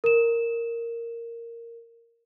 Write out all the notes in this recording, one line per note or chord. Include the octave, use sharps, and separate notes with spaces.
A#4 E7